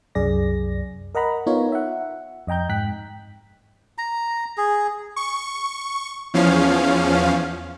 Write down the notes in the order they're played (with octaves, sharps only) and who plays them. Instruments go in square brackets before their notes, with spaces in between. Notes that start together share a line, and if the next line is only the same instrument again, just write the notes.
[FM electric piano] C2 F#2 G#4 D5 A#6
A#4 D#5 F#5 A#5 B5
B3 D#4 F4 A#4 C#5
E5 F#5
F2 D#5 G5 A#5 G6
G#2 G5 F#6 B6
[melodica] A#5
G#4
[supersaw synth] C#6
E2 F3 C#4 F5